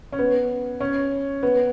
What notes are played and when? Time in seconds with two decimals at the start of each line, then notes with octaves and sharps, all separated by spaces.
0.12 C#4
0.19 B3
0.80 C#4
1.43 B3